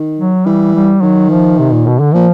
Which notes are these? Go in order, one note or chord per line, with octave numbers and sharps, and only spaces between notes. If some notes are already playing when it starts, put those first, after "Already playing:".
Already playing: D#3
F#3
E3 G3
G3
D#3 F#3
F3
C3
A#2
B2
D3
A#2 F3